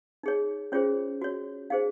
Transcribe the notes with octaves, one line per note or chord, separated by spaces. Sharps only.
D#4 G#4 C#5
C#4 F4 G#4 C5 C#5
F#4 C#5
D#4 G#4 C5 F5